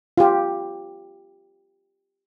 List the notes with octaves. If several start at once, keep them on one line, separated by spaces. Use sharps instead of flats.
F4 G4